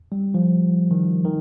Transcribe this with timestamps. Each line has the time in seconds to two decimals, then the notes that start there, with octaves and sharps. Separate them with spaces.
0.12 G3
0.34 F3
0.91 D#3
1.25 D#3